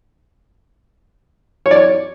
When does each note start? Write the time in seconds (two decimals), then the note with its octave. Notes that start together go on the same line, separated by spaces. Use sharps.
1.66 C#5
1.71 D5
1.76 C#5